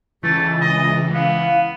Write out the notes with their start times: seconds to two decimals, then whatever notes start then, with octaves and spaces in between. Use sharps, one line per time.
0.23 C#2 E3 A3 A6
0.61 D#5
1.14 B3 F5